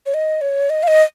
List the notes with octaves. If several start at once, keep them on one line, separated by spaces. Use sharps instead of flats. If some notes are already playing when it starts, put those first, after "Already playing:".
C#5
D#5
C#5
D#5
F5
D#5